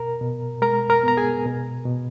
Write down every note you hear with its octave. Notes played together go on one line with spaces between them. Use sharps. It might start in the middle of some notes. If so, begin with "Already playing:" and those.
Already playing: B2 A#4 A#5
B2
G#3 A#4 A#5
A#4 A#5
B3 A#5
G#4 G#5
B2
B2